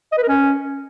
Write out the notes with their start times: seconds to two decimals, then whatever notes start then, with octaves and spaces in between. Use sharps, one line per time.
0.12 D#5
0.18 B4
0.23 A#4
0.28 C#4